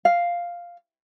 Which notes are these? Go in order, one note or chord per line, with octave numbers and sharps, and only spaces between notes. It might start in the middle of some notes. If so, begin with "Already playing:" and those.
F5